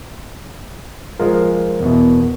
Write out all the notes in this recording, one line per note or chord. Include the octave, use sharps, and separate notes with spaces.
F3 G#3 F4 A#4
E2 B2